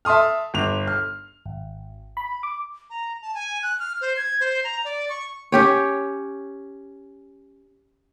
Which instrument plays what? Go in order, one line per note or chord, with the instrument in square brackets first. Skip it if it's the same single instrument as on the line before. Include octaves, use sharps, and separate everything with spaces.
[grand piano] E5 A5 C6 D#6 F6
G1 F7
F6
[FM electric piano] G#1
B5
D6
[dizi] A#5
A5
G#5
F#6
F6
C5
G#6
C5
A#5
D5
C#6
[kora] C#4 G4 C#5